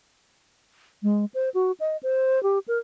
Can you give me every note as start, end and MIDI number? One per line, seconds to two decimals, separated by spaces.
1.03 1.25 56
1.34 1.49 72
1.54 1.72 66
1.80 1.97 75
2.03 2.42 72
2.43 2.59 67
2.68 2.78 70